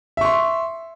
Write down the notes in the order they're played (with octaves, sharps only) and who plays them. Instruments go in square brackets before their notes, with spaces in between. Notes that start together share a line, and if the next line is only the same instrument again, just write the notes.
[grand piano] E5
C#6
C6